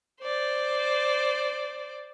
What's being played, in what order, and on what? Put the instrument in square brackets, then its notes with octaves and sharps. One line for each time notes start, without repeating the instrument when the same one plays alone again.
[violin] C5 D5